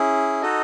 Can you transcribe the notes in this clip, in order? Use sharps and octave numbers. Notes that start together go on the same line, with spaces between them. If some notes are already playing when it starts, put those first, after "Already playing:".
Already playing: C#4 E4 G#4
D#4 F#4 A4 D#5